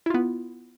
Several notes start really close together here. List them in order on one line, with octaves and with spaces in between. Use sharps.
E4 F4 B3